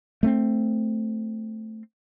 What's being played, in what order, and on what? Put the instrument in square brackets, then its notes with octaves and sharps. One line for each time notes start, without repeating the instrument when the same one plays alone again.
[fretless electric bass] A3 A#3 C4